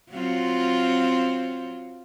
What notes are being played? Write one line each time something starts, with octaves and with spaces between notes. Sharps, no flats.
F#3 C4 F4